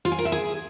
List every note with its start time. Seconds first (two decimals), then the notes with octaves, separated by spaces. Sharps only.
0.05 F4
0.12 G#5
0.19 A#4
0.25 E5
0.32 G#4